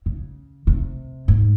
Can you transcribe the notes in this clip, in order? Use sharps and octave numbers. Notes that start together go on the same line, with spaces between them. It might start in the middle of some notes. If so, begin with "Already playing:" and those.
C#3
C3
G#2